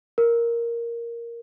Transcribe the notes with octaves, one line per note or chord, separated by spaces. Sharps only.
A#4